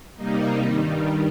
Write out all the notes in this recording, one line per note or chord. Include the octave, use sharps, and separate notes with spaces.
C3 G3 A#3 D#4
G2 D#3 G3